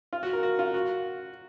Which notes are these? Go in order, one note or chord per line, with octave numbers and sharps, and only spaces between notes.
F4
F#4
A#4
F#4
F4
F#4